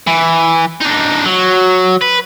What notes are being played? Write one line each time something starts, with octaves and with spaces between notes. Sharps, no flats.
E3
D4 D#4
F#3
B4